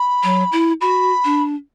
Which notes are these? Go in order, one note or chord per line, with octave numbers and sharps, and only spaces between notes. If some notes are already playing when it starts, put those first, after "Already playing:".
Already playing: B5
F#3
E4
F#4 B5
D4